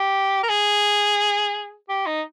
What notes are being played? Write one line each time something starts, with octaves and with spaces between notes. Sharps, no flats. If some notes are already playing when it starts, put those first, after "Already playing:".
Already playing: G4
A#4
G#4
G4
D#4